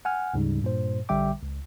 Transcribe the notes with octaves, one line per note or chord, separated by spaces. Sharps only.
F#5 G#5 F6
D2 G#2 C#3 G3 D#4
G2 A#2 C5
A#1 D3 G3 E5 G5 D6
C#2